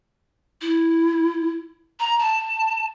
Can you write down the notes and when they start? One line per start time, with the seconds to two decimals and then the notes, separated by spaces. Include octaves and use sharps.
0.61 E4
2.00 A#5
2.19 A5